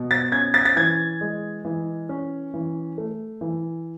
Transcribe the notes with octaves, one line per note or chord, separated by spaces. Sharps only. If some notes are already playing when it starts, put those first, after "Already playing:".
Already playing: B2
A6
C#4 G#6
A6
A6
E3 G#6
G#3
E3
C#4
E3
A3
E3